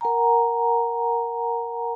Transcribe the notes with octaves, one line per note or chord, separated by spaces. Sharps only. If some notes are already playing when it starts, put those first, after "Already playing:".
A#4 F#5 G#5 A#5